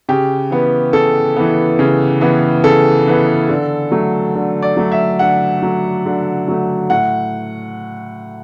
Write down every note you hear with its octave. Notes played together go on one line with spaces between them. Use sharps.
C#3 G4
E3 B3
C#3 A4
E3 B3
C#3
E3 B3
C#3 A4
E3 B3
D3
F#3 A3
D3
D5
F#3 A3
E5
D3 F#5
F#3 A3
D3
F#3 A3
A2 F#5